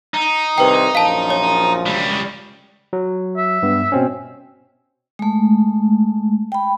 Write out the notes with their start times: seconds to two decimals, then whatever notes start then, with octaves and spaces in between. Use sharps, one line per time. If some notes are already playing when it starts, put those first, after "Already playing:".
0.14 D#4
0.58 C2 C3 D#3 B4 G5
0.95 A#1 F#2 F3 F5 A5
1.30 C#5
1.86 C#2 G3
2.93 F#3
3.37 E5
3.63 G2 B3
3.92 B2 C4 C#4
5.19 G#3 A3
6.52 G5 B5